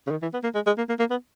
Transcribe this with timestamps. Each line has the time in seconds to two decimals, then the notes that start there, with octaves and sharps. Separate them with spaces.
0.07 C#3
0.11 D#3
0.22 E3
0.33 B3
0.44 A#3
0.55 G#3
0.67 G#3
0.78 A#3
0.89 A#3
0.99 A#3
1.11 B3